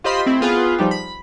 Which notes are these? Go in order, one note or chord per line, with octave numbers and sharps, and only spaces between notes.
F4 G4 C5 D#5 B5 C6
A3 C4 E4
B3 F4 G#4 B4
F3 G3 D#4 G4
B5